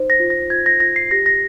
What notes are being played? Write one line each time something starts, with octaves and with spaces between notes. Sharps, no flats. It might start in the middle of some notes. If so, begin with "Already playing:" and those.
Already playing: D#4 C5
A#6
F4
A#6
F4 G#6
A#6
F4 A#6
C7
G4 A#6
A#6